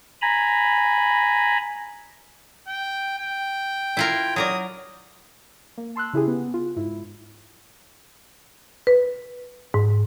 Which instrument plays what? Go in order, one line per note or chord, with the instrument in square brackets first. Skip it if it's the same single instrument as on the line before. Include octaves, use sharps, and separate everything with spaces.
[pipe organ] G#5 A#5 B5
[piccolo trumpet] G5
G5
[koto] E4 F4 A#4
[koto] F#3 A#4 D5 [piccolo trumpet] D#6
[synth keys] A#3
A5 C6 E6 F#6
C#3 E4 G4 G#4
B3
F4
G#2 E4
[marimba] B4
G#2